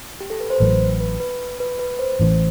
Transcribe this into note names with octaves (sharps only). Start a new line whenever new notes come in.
G4
A4
B4
C5
A1 A2 F#3 B4
B4
B4
B4
B4
C5
A1 A2 E3